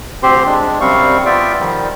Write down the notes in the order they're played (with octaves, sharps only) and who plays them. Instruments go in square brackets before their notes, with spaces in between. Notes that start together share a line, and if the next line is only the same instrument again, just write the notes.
[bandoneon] D2 C4 G4 C5 C6
G#3 D4
F#2 C3 G3 C4 F5 C#6
B3 F4 D5 E5 G5
D#3 F3 G3